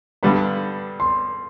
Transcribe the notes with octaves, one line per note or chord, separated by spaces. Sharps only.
G2 D3 G3 B3 B5
C6